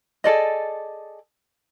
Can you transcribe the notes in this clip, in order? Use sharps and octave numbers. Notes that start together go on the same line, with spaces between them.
G#4 A4 D5 D#5